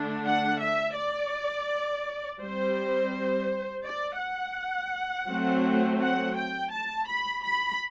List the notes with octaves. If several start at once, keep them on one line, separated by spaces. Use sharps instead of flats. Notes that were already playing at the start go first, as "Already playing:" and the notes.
Already playing: D3 A3 D4
F#5
E5
D5
G3 C4 C5
D5
F#5
F#3 A3 C4
F#5
G5
A5
B5
B5